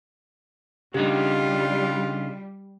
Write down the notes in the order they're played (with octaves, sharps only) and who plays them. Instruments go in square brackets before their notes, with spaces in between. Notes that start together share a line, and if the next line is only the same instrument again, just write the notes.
[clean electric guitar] C#3 D4 D#4 [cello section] G3 [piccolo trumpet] F4 [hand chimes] G4